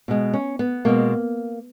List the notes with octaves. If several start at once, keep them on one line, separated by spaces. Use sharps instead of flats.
B2 G#3
C#4
B3
B2 G#3 A#3